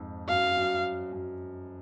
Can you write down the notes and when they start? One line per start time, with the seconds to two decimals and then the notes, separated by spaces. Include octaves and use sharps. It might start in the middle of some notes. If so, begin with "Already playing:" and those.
Already playing: F2 G#2
0.29 F#2 F5
0.57 F#2
1.12 F#2